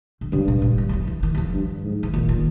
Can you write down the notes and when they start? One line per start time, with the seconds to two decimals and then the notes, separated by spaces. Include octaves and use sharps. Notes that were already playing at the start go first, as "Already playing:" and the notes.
0.21 D3
0.32 G2 C#3
0.48 A#2
0.62 A#2
0.78 E3
0.89 E3
0.93 F3
1.08 E3
1.23 D#3
1.35 E3
1.38 F3
1.53 G2
1.84 G#2
2.03 E3
2.14 A#2 D#3
2.29 D#3